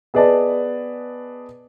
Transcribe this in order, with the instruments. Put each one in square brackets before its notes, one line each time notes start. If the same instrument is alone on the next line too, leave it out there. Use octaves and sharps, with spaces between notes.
[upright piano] B3 G#4 B4 D5 D#5 A5